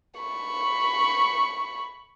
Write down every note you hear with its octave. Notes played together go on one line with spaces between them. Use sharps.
B5 C#6